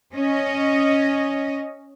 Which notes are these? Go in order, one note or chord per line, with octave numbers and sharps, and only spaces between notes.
C#4 D#5